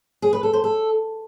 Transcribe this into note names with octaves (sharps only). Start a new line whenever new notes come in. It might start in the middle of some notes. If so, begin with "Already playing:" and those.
G#4
B4
A4
C5
A4